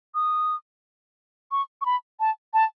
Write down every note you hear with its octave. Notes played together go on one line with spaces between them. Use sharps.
D#6
C#6
C#6
B5
A5
A5